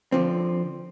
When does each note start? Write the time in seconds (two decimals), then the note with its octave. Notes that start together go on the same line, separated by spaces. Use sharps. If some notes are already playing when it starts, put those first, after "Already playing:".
0.12 D3 F3 C4